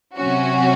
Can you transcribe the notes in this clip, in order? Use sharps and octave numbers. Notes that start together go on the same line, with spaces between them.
C3 F#3 C#4 F#4